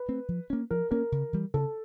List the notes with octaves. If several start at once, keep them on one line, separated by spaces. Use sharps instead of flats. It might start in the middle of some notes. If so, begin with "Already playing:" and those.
Already playing: B4
A3 C4
F3
A#3 C#4
F3 A#4
A#3 C#4 A#4
C#3
E3 G3
C#3 A4